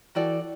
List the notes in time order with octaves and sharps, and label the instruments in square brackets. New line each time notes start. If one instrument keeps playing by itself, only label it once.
[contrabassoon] E3 [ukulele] F#4 A4 D5 G5